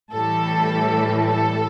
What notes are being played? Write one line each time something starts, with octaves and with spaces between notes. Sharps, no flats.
A2 E3 G3 A4
A4